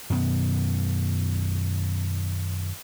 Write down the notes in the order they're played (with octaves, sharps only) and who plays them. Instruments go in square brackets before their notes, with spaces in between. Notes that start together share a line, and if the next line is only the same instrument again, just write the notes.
[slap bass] F#2 B2 D#3 B3